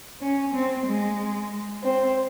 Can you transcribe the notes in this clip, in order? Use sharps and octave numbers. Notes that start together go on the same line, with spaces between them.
C#4
C4
G#3
C4